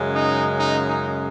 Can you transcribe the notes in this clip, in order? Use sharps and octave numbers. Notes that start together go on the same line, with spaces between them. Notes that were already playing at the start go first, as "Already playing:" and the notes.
Already playing: F#2 C#3 G#3
D#4
D#4
D#4